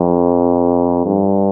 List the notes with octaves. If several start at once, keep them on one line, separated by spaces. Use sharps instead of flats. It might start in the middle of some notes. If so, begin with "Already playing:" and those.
Already playing: F2
G2